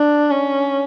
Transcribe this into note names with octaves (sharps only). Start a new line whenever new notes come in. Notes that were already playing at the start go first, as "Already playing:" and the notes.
Already playing: D4
C#4